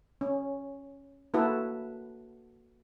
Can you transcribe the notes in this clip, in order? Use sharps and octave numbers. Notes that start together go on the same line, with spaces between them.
C#4
A#3 E4 F#4 A4 B4